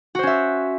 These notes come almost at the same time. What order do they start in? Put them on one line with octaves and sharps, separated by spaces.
F#4 C5 C#4 E5